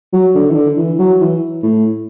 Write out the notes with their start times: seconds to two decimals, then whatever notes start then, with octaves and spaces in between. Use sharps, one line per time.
0.13 F#3
0.35 D3
0.51 E3
0.56 D3
0.77 E3
0.99 F#3
1.21 E3
1.63 A2